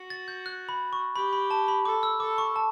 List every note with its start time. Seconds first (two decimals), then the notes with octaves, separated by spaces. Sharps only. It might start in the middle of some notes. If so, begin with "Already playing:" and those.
Already playing: F#4
0.10 A6
0.28 G6
0.46 F#6
0.69 B5
0.93 C#6
1.15 G4 B5
1.33 B5
1.51 A5
1.68 B5
1.85 A4 D6
2.03 E6
2.20 A4 D6
2.38 C#6
2.56 A5